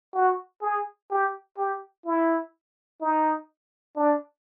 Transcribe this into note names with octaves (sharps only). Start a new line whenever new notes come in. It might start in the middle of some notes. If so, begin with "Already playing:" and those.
F#4
G#4
G4
G4
E4
D#4
D4